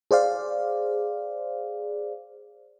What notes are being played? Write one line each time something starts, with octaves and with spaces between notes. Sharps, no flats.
G#4 C5 D5 F5